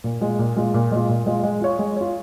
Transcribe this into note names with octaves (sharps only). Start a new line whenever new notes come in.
A#2
G#3 F4
A#2
G#3 F4
A#2
G#3 F4
A#2
G#3 F4
G#3
F4 C#5
G#3
F4 C#5